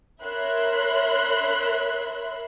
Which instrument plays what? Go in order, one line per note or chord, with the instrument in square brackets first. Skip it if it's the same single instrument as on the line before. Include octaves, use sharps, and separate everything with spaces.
[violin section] A#4 C#5 E5 B5 C6 F#6